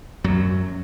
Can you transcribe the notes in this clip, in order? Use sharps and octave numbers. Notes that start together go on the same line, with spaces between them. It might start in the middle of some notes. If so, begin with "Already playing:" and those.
F#2 F#3